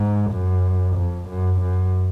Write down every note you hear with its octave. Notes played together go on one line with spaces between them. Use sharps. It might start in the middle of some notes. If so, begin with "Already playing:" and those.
Already playing: G#2
F#2
F2
F#2
F#2